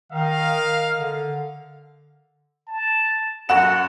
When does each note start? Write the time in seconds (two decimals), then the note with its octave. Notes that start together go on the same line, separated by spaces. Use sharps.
0.12 D#3 A#4 D#5 F5
0.96 D3
2.67 A5
3.49 F#2 F#4 F#5 E7